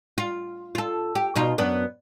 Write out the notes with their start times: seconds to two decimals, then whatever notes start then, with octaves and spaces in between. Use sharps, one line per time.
0.18 F4
0.75 F4 A4
1.15 G4
1.36 B2 D#4 F4
1.58 F#2 B3 D4